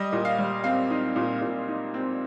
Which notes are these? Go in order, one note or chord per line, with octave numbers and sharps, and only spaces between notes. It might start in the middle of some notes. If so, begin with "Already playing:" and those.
Already playing: G3 D#5
A#2
F5
G3
C4 F5
D#4
A#2
A#2
D#4
C4